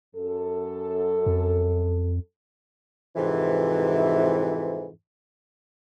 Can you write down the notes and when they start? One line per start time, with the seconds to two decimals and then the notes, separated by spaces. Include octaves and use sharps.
0.16 F#2 A4
1.26 F2
3.16 F2 G#2 C3 E3